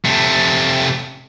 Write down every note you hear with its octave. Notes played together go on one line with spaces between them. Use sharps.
C3 A3